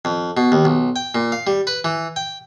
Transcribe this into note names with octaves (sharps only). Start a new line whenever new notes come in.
F2
B2
D#2
B1
G5
A#2
F5
G3
B4
E3
G5